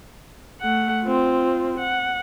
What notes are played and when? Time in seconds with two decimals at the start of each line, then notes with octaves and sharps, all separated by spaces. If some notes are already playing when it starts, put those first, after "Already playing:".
0.61 A3 F#5
1.03 C4 F4
1.79 F#5